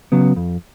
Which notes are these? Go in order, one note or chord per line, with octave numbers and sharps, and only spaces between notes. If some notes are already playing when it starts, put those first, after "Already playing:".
C#3 F#3 B3
F2